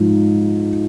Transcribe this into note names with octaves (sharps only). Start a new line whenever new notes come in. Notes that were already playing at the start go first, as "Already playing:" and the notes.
Already playing: G#2 F3